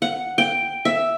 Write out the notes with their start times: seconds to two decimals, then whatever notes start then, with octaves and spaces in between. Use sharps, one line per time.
0.02 F#5
0.38 G5
0.85 E5